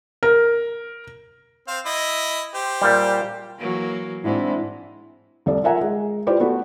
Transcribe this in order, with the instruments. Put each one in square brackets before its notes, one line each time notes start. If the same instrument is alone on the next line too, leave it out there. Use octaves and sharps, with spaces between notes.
[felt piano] A#4
[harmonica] C4 C5 F5
E4 D#5 B5
G4 C5
[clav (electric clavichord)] A#2 G3
[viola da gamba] E3 F#3 A#3
[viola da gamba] G#2 [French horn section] C4 D4 E4
[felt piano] C2 A4 D5
F4 A#4 E5 F#5 G#5 A#5
G#3
E4 F4 G4 B4 C5 D5
A3 B3 F#4 B5